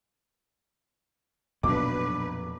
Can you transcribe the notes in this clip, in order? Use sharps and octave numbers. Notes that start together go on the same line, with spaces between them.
B1 F2 A#2 F#3 B3 D4 B4 D6